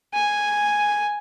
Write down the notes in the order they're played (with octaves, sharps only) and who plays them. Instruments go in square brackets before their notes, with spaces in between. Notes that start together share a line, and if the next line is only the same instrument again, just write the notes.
[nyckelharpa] G#5